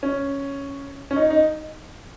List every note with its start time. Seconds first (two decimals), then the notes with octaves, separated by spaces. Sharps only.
0.03 C#4
1.11 C#4
1.16 D#4
1.30 D#4